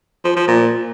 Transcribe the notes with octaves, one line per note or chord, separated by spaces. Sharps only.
F3
F3
A#2